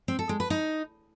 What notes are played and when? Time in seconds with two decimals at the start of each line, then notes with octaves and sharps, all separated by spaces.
0.08 C4
0.19 A4
0.29 G#3
0.40 B4
0.50 D#4